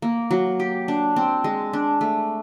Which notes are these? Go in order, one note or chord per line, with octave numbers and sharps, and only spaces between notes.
A#3
F#3
G4
D4
C4
G#3
D4
A3